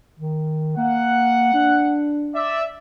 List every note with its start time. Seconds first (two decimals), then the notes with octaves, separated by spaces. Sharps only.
0.20 D#3
0.77 A#3 F#5
1.54 D4
2.34 D5 E5